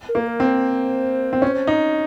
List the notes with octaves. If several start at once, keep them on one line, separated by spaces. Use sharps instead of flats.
A#4
A#3
A#4
C4
C5
C4
C#4
D#4